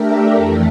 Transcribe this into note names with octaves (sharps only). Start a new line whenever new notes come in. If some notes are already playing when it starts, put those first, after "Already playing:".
Already playing: A3 D4 G4 A#4 E5
F2 E3 A3